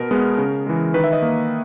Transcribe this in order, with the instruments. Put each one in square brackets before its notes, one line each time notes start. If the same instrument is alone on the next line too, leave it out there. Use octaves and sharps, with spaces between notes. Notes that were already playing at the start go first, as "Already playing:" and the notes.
Already playing: [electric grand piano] B2 A#4
G#3 B3
C#3
E3 G#3
D#3 B4
E5
D#5
A#3